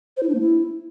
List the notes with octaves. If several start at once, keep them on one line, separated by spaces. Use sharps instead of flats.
C5
E4
D4
A#3
E4